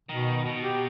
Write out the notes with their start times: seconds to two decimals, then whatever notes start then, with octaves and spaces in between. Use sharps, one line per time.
0.09 B2 D#3
0.46 B2
0.62 G4